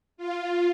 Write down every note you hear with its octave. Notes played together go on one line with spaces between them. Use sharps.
F4